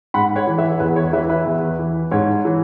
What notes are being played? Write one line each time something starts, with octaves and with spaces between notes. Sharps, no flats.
G#2 F#5 B5
C#5 F#5
E3
B4 E5
C#5
E2 B4
C#5
E3 B4 E5
B4 E5
E2
E3
G#2 C#5
E3